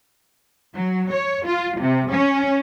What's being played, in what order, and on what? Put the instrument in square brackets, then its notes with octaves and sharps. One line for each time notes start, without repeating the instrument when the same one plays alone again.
[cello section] F#3
C#5
F4
C3
C#4